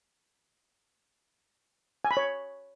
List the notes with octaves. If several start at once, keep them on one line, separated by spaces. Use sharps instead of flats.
G#5
B5
C#5